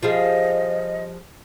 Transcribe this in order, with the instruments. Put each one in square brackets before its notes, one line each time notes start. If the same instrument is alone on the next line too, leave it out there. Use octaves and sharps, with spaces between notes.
[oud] F3 G3 G#4 [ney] D#5